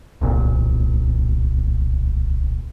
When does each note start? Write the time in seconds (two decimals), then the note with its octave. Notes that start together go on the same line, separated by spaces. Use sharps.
0.21 D1 C2 A#2